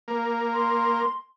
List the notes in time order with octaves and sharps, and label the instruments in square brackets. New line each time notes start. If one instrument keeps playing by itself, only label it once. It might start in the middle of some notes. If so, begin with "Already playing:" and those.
[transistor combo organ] A#3
[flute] C6